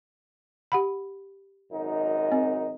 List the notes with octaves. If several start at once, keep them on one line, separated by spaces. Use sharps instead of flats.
G4 F#5 B5
G#1 F#2 D#4
C4